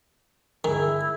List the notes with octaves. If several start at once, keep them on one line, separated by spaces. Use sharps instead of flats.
G2 D3 D#3 E4 G#4